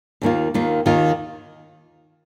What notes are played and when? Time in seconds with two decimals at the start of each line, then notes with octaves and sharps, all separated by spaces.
0.22 D#2 D#3 A#3 F4
0.54 D#2 D#3 A#3 F4
0.86 D#2 D#3 A#3 F4